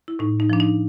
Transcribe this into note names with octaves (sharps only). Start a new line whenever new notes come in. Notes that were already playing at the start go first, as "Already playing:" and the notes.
E4
A2 D#4
D#4
F3 D4
D#4